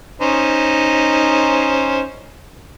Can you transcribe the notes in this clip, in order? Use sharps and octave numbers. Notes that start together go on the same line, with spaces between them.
C#4 D#4 C5